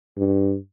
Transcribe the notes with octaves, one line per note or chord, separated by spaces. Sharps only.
G2